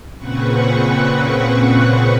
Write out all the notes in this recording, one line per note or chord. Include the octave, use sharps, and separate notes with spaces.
A#2 C#3 C4 B4 F#5 C#6